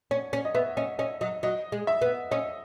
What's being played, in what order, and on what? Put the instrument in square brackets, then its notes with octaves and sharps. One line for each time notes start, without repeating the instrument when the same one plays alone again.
[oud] C#4 [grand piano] C#5
[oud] C#4
[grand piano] D#5
[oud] B3 [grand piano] E5
[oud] C#4 [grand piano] D#5
[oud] C#4 [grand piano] D#5
[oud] F#3 [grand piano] D#5
[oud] F#3 [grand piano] D#5
[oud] G#3
[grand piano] E5
[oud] B3
[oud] C#4 [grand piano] D#5